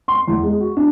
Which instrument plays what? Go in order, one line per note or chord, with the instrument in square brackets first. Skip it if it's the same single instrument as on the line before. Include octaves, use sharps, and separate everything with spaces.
[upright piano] C6
E2
G#3
F#4
D4